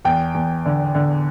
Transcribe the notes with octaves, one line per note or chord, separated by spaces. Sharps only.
E2 G5
E2
D3
D3